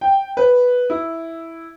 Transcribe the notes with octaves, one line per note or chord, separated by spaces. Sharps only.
G5
B4
E4